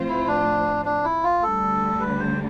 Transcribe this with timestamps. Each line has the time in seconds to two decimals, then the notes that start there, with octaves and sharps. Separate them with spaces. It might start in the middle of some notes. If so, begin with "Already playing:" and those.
Already playing: A2 F3 C4 F4 C5
0.08 E4
0.27 D4
0.85 D4
1.04 E4
1.24 F4
1.42 D2 D3 G3 A4
2.00 B4
2.20 C5